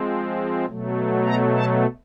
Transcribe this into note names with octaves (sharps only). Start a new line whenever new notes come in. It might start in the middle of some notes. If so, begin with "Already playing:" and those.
Already playing: F3 G#3 C4
B2 F#3 A3
A#5
A5